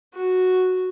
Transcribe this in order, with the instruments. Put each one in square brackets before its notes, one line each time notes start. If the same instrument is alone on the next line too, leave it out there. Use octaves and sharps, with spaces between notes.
[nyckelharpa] F#4